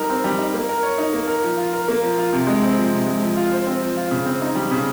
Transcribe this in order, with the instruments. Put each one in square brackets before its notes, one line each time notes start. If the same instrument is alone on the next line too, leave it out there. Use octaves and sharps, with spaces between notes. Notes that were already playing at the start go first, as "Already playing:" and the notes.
Already playing: [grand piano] G3 D#4 A#4
C4
G3
D#4
A#3
A#4
C#5
D#4
A#3
A#4
F3
F4
A#4
A#3
F3
F4
C3
G#3
C4
F3
C3
G#3
F3
F4
C5
C4
F3
F4
C#3
C4
D#4
G3
C#3